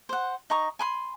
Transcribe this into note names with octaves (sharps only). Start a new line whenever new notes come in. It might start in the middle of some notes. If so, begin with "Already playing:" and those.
C5 F#5
D#4 A#5 C#6 D#6
G#5 B5 C6